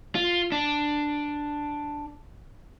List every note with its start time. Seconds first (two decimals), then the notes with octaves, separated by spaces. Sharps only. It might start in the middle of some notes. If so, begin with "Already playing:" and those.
0.15 F4
0.52 D4